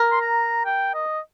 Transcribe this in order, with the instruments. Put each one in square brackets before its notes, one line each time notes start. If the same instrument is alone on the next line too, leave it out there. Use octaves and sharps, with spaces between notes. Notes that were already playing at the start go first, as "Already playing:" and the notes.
Already playing: [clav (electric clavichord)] A#4
[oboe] C6
A#5
G5
D#5